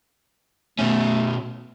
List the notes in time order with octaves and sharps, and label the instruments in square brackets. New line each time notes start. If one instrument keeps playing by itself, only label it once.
[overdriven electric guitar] B2 C#4 [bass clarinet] A3